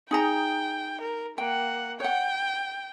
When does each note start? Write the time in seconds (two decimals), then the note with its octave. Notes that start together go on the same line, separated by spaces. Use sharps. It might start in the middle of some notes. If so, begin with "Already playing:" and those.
0.11 D#4 G#4 G5 A#5
1.01 A#4
1.38 A#3 F#5 G5
2.00 C#5 F#5 G5